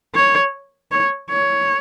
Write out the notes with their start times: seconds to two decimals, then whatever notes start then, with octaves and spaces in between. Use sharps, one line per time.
0.15 C#5
0.92 C#5
1.30 C#5